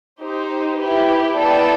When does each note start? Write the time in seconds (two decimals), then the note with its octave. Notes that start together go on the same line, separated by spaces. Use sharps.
0.21 D#4 G4 C5
0.79 E4 G4 B4
1.35 B3 E4 A4 D5 G5